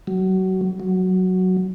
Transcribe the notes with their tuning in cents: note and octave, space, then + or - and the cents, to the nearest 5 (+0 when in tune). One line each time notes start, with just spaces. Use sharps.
F#3 +25
F#3 +0